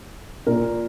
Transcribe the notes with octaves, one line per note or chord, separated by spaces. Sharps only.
A#2 A#4